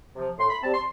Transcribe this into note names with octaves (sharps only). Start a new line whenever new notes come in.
C3 F3
A2 C6
B5
G3 C4 A5
C6